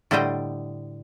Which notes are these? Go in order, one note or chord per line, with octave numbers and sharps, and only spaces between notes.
A2 D3 G3 C5 D#5 G5